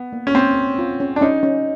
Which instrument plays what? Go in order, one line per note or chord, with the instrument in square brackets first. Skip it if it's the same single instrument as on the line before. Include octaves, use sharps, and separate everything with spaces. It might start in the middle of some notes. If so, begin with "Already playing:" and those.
Already playing: [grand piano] B3
[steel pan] A#3
[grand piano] C#4
[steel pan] A#3 [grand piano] C4
[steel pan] C#4
F4
C#4
[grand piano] D4
[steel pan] C#4 [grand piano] D#4
[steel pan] C#4